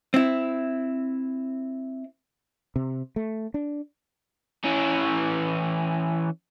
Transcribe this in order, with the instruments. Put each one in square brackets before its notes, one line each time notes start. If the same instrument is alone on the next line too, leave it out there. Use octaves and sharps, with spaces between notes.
[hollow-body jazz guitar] C4 E4
[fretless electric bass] C3
A3
D4
[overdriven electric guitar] E3 C#4